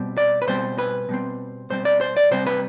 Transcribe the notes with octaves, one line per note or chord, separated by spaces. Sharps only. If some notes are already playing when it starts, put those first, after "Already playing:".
Already playing: B2 G3 C4
D5
B4
B2 G3 C4 C5
B4
B2 G3 C4
B2 G3 C4 C5
D5
C5
D5
C3 G3 C4 C5
B4